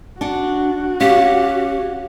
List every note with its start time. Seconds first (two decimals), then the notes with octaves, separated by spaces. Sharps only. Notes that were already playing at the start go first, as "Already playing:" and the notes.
0.21 D4 F#4 F#5
1.01 C#4 G4 F5